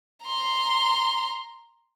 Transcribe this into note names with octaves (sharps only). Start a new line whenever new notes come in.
A#5 C6